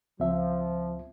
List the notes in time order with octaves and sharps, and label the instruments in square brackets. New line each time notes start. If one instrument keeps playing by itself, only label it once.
[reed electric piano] C#2 C4 E5 [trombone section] F3